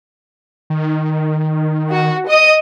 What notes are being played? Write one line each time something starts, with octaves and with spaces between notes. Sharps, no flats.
D#3
F#4
D#5 D#6